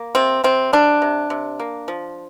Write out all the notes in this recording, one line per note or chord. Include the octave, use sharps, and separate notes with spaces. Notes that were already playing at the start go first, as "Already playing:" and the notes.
Already playing: A#3
C3 C4
C3 C4
G3 D4
C3
C3
A#3
F3